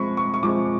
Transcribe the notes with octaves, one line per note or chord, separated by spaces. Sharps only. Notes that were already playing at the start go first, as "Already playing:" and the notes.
Already playing: F3 G#3 C4 B5 C#6
C#6
C#6
F3 G#3 C4 D6